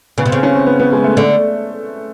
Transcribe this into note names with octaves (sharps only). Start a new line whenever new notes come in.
C#3 B3
C3
C#3 C4
C#4
C4
B3
B3
G#3
A3
D3 A3